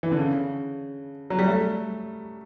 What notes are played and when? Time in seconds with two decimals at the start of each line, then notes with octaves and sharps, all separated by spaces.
0.03 E3
0.12 D3
0.19 C#3
1.30 F#3
1.39 G3
1.47 A3